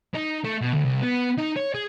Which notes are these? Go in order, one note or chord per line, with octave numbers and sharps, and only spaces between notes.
D#4
A3
B2
D2
C2
B3
D#4
C#5
G#4